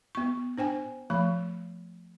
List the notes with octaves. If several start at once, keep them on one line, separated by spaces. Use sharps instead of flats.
B3 C#6
D4 C5 G5 G#5
F3 A3 B5